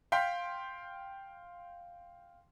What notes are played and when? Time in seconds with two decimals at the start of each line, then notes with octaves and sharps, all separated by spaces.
0.12 F5 G5 C6 G6 B6